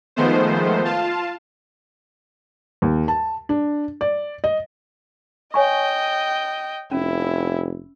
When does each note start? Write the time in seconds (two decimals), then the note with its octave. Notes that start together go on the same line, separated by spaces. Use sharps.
0.16 D#3 F3 G#3 A3 B3 C5
0.85 F4 F5 A5
2.82 D#2
3.08 A5
3.49 D4
4.01 D5
4.44 D#5
5.54 C#5 D#5 G5 G#5 C#6
6.91 F1 C#4 E4